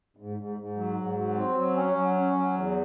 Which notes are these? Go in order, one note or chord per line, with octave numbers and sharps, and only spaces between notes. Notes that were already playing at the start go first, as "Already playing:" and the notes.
G#2
G#2
G#2
F#3
G#2
F#3
C4
F#3
C#4
F#3
C#4
F#3
E2